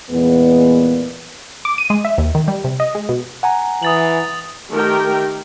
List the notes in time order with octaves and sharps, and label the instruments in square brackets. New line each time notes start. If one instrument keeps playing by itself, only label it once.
[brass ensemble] E2 A#2 G#3 B3
[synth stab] D6
D#7
G#3
E5
D#2
D#3
G3
C3
D#5
G#3
B2
[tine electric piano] F#5 G#5 A#5
[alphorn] E3 [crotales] D#6 A6 F#7
[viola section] D#3 A3 G4 A#4 G5